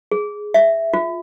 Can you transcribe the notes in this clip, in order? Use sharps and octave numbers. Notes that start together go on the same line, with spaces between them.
G#4
E5
F4